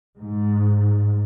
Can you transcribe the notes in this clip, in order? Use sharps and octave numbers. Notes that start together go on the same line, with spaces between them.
G#2